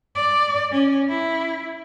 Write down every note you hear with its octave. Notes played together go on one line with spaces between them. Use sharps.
D5
C#4
E4